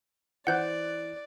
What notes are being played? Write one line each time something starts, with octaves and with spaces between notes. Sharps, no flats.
E3 C5 D5 F#5 F#6 G6